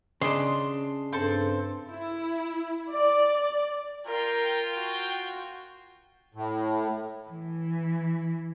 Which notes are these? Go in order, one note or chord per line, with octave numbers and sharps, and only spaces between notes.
C#3 D4 D#5 C6
G2 C4 A4 C5
E4
D5
F4 A#4 G5
F#4
A2
E3